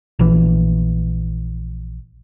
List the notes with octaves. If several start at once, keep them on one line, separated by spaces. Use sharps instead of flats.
A#1 E3